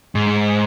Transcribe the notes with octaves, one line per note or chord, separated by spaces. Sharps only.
G#2